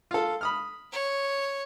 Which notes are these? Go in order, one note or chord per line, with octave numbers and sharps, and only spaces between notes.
F4 A4
B5 D#6 F6
C#5